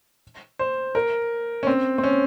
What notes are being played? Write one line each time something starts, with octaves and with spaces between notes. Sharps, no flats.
C5
A#4
C#4
C4
C4
C#4